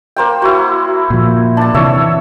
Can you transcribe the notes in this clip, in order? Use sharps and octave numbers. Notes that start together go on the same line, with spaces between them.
A#3 C5 G5
E4 F#4
A#2 F3
D4 A5
C3 E3 C#5 E5